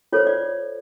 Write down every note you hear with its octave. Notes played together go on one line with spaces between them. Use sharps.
F4 A4 C5 C#5
D5